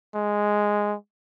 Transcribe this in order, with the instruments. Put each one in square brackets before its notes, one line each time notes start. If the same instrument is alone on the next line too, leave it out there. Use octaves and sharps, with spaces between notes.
[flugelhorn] G#3